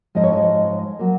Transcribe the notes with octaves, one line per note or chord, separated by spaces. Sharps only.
G#2 F3 G#3 D#5
C#5
D#5
F#3 A#3